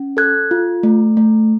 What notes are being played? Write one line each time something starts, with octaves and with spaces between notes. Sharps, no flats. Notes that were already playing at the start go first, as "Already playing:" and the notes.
Already playing: C#4
A4 F#6 G#6
F4
A3
A3